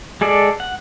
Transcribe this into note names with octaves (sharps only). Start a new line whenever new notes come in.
G#3 G#4 A4 D5
F#5